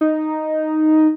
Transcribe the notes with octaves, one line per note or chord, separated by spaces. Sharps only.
D#4